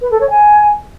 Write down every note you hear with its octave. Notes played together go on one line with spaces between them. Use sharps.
B4
A4
C#5
G#5